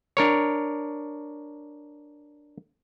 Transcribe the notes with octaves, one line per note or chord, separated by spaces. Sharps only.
D4 A#4 C#5